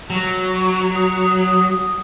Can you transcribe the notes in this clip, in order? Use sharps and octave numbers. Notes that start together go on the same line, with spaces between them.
F#3
D#6